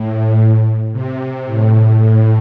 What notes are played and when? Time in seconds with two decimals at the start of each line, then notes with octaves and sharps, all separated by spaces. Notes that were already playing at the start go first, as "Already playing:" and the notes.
Already playing: A2
0.93 C3
1.46 A2
1.98 A2